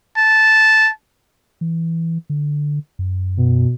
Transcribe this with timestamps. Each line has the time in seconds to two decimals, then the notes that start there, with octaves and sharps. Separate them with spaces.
0.17 A5
1.61 E3
2.30 D3
2.99 F#2
3.37 B2